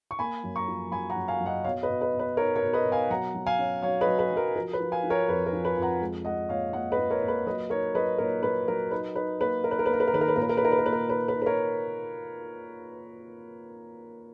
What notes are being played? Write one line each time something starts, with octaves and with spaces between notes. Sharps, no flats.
C#6
A#3 G#5 B5
F#2
A#5 C#6
F3
F#2 G#5 B5
F#5 A#5
F#2
F5 G#5
F#2
D#5 F#5
B2 C#5 F5
B4 D#5
B2
B4 D#5
B2
B4
D#4 A#4 C#5
A#4 C#5
B2
B4 D#5
B2
F5 G#5
F#3 F#5 A#5
F#3
F5 G#5
C#4
F#3 C#5 F5
B4 D#5
F#3
B4
F#3
A#4
F3 A#4
B4
F3
F5 G#5
F3
A#4 C#5
F2 B4
A#4
F3
B4
F2
F#5 A#5
G#3
G#3 D#5 F#5
A#2 C#5 F5
A#2 D#5 F#5
B4 D#5
A#2
A#4 C#5
A#2
B4
F#3 B4 D#5
D#4 A#4 C#5
F#3 B4 D#5
A#2 A#4 C#5
A#2 B4
F#3 A#4
D#4 B4
D#4 B4
A#3 B4
D#4 A#4
B4
A#4
B4
A#3 A#4
B4
A#4
D#3 B4
A#4
B4
A#2 A#4
B4
A#4
B4
D#4 A#4
B4
A#4
A#2 B4
A#4
D#4 B4
B4
D#4
B4
A#4 C#5